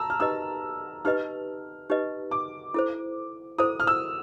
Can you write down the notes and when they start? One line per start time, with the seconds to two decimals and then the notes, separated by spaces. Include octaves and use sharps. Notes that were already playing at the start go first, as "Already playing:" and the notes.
Already playing: A5 A#5 E6
0.10 F6
0.20 D#4 G4 B4 D#5 E6
1.05 D#4 G4 B4 D#5 F6
1.90 D#4 G4 B4 D#5
2.31 D6
2.74 E4 A4 C5
3.58 E4 A4 C5 D#6
3.80 F6
3.87 E6